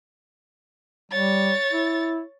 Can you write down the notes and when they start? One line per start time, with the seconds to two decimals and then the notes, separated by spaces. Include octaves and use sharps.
1.12 G3 C#5 A6
1.73 E4